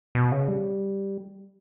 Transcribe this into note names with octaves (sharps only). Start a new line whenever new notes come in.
B2
C#3
G3